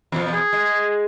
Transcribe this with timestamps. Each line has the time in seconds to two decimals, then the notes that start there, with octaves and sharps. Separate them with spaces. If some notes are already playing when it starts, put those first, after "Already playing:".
0.12 E2 B2 F3
0.34 G#4
0.53 G#3